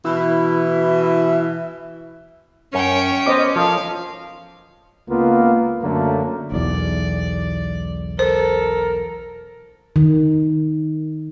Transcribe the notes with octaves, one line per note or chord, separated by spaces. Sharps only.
B2 E3 E4
F#2 C#4 A#4 C#5 G5 A#5
B3 C5 D#5 D6
F3 A4 A#4 F5
C#2 A#3 B3 F4
F#2 D3 F#3 A3 A#3
B1 E2 D5
A4 A#4 C5
D#3